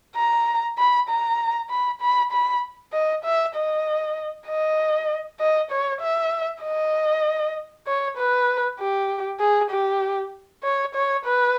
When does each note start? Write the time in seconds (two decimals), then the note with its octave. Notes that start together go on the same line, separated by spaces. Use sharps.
0.16 A#5
0.78 B5
1.09 A#5
1.70 B5
2.01 B5
2.32 B5
2.93 D#5
3.24 E5
3.55 D#5
4.48 D#5
5.40 D#5
5.71 C#5
6.01 E5
6.63 D#5
7.87 C#5
8.17 B4
8.79 G4
9.40 G#4
9.71 G4
10.64 C#5
10.95 C#5
11.26 B4